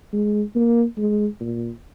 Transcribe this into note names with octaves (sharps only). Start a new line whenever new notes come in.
G#3
A#3
G#3
A#2